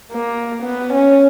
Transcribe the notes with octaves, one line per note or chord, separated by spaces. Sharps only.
A#3
B3
C#4